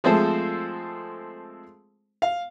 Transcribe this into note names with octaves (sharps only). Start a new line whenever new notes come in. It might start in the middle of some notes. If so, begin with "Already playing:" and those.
F3 G#3 A3 C4 A4 C5
F5